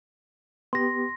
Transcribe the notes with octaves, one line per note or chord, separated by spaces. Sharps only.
B3 G4 C6 A#6